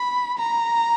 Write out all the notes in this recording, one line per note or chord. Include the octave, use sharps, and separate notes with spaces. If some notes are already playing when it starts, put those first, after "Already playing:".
Already playing: B5
A#5